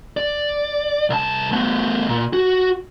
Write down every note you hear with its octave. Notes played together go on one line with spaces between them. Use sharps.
D5
C2 A5
A3 B3
A#2
F#4